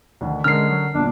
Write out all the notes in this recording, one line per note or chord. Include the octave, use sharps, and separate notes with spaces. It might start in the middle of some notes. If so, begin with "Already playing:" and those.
D2 D3 D#3
D3 G#3 C#4 A#4 F6 C7
F#3
G1 A#2 D4